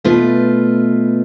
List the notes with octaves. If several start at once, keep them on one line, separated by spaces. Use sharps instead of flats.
B2 A3 F4 B4